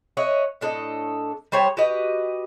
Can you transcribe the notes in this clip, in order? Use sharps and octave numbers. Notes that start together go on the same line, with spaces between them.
C#5 D#5 E5 F#5
A2 D4 A4 D#5
G3 C5 C#5 G5
F#4 G4 B4 D#5